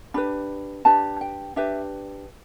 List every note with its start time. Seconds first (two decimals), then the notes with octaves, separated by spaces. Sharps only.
0.14 D4 G4 B4 B5
0.85 D4 G4 B4 A5
1.21 G5
1.56 D4 G4 B4 E5